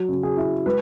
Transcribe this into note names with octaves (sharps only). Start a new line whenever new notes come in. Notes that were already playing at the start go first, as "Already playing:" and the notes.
Already playing: F#3
C#3
G#4
E4
G#3 B4